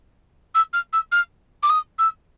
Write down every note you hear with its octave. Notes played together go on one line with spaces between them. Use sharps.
E6
F6
E6
F6
D6
D#6
E6